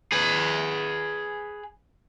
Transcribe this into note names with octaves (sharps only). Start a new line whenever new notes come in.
G#4 B4